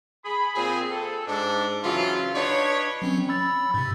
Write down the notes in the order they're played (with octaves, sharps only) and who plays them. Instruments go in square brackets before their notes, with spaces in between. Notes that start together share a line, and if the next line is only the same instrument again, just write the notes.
[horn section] G#4 B5
A#2 C4 G#4
A4
G#2 D4
C#3 E3 F#3 F4
D4 D#4 B4 C#5
[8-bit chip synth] F#3 C4 C#4
B5 E6 A6
G#2 C3